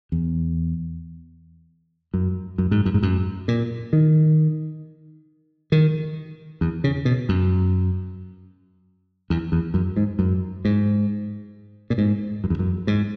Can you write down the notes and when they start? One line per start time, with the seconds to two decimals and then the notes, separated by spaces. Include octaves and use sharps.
0.12 E2
2.14 F#2
2.58 F#2
2.71 G#2
2.86 F#2
2.94 G#2
3.03 F#2
3.48 A#2
3.93 D#3
5.72 D#3
6.61 E2
6.84 C#3
7.05 B2
7.29 F#2
9.30 E2
9.52 E2
9.74 F#2
9.96 G#2
10.19 F#2
10.65 G#2
11.90 A#2
11.98 G#2
12.44 F#2
12.50 E2
12.59 F#2
12.87 G#2